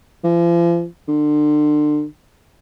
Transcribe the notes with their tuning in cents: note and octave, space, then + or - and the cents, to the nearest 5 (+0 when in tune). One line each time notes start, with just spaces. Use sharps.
F3 -40
D3 +35